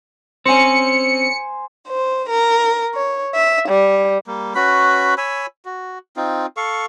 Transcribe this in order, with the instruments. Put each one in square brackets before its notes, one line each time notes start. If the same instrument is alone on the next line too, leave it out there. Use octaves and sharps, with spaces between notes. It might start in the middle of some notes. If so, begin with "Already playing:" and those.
[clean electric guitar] C4 C#4 [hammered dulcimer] C5 G#5 [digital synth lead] C#7
[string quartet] C5
A#4
C#5
E5
G3
[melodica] G3 A#3
C#4 F#4 B4 B5
C#5 G#5 B5 E6
F#4
C4 D#4 F4
A4 F5 C#6